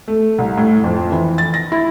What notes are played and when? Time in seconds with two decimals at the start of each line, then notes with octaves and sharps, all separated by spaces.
0.08 A3
0.38 C2
0.57 A2
0.84 F2
1.12 E3
1.38 A6
1.54 A#6
1.72 E4